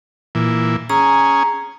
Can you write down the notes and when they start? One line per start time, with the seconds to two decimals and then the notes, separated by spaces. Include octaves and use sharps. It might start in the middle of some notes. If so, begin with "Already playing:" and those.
0.35 A#2 E3
0.90 C#4 G#4 A#5